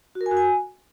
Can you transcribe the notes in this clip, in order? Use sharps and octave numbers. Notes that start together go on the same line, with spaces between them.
F#4
A#4
G#5
F#4
G#5